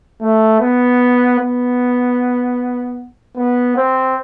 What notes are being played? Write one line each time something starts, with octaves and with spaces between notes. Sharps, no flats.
A3
B3
B3
B3
C4